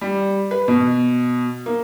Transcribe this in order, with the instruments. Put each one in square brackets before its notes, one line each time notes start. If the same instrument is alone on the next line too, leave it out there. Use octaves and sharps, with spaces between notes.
[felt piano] G3
B4
B2
A#3